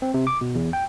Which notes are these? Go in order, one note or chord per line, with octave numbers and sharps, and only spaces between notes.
C4
C3
D6
B2
E2
G5